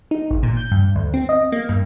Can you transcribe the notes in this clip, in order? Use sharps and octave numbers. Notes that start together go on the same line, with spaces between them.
D#4
G#1
A#2
G6
G2
D2
C4
D#5
A#3
G2